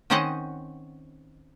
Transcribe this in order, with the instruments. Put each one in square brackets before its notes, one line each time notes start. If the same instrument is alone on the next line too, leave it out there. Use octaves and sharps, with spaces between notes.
[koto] D#3 C4 C#4 C5 D#5 F#5